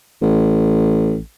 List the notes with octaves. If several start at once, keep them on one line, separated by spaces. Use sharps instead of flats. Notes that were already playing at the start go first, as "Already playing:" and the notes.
A1